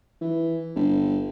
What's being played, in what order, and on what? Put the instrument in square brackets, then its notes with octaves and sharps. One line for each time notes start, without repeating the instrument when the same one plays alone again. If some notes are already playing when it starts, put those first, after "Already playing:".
[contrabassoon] E3
G1